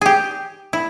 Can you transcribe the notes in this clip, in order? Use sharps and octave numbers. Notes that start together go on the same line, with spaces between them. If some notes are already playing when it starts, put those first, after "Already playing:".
G4 G#4
E4